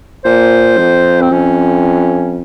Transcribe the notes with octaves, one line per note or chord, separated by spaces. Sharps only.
A#2 C5
F2
C4
F2 C#4